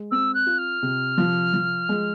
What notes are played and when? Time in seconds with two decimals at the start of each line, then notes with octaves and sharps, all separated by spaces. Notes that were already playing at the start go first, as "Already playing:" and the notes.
Already playing: G#3
0.11 C4 E6
0.34 F#6
0.46 F4
0.58 F6
0.82 C3
1.18 F3
1.53 F3
1.89 G#3